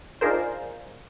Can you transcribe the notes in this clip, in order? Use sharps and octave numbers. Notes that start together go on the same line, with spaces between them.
D4 D#4 F4 G#4 A#4 C5